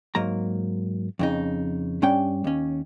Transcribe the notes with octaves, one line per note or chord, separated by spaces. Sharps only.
G#2 F#3 A#3 A#5
F2 C#3 D#4
G2 G3 C#4 D4 G5
D#2 C#4